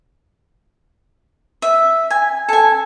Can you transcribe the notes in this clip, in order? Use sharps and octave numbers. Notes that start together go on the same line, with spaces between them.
E5
G#5
A4 G#5